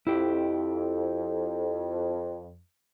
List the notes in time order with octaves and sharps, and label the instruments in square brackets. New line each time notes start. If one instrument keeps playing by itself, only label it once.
[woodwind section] F2 [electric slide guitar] E4 G4